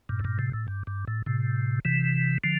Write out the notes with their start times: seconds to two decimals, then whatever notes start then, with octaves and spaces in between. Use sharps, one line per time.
0.09 G2 A#2
0.19 A2
0.24 G2 A#2
0.39 A2 C3
0.53 A2
0.68 G2
0.87 G2
1.08 A2
1.26 A2 C3
1.85 C3 E3
2.44 D3 F3